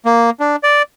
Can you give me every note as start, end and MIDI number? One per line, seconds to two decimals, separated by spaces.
0.05 0.30 58
0.40 0.56 62
0.63 0.82 74